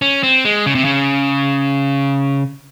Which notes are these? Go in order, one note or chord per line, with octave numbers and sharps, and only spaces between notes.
C#4
C4
G#3
C#3
C3
C#3